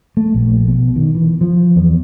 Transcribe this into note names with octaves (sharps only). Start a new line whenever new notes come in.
A3
A#1
B2
D#3
E3
F3
E2